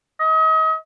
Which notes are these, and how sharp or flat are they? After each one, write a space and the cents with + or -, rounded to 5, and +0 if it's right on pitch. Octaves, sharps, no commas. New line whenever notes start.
D#5 +35